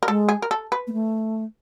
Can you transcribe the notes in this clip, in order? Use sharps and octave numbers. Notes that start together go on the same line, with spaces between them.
A#4
G#3 A4
G#4
A#4
A4
B4
A#3
A3